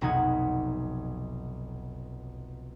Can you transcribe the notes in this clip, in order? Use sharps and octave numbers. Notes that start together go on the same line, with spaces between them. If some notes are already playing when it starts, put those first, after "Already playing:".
F1 B1 B2 D#4 F#5 G#6